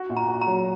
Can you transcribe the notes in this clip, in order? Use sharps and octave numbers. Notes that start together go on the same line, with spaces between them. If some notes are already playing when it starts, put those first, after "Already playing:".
Already playing: F#4
A#2
A#5
F#4
A#5
F#3